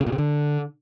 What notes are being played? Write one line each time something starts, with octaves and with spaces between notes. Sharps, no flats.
C#3
A#2
C3
D3